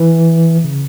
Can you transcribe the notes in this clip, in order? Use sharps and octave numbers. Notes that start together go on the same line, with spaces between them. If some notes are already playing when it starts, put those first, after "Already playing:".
Already playing: E3
C#3